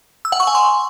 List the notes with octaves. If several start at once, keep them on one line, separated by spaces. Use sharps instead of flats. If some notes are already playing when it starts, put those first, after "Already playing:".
E6
F#5
C#6
G#5
C6